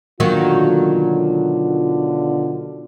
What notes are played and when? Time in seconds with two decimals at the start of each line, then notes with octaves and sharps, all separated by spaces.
0.20 B2 D3 D#3 F#3 A#3 F4